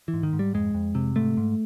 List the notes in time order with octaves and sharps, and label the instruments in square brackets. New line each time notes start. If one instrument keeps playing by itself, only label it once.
[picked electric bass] E3
G#2
D#3
G#2
G3
F2 G#3
F2
C3
G#2 A3
G#2